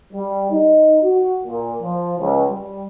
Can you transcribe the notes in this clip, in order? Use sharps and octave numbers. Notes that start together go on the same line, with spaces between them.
G3
D#4
F#4
A#2
F3
C#2
G3